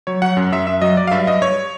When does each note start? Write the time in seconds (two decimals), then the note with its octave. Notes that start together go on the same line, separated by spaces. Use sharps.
0.07 F#3 C#5
0.22 F#3 F#5
0.37 F#2
0.52 F#2 E5
0.67 F#2 E5
0.82 F#3 D#5
0.97 F#3 D5
1.07 F5
1.11 G2 E5
1.27 G2 D#5
1.41 G2 C#5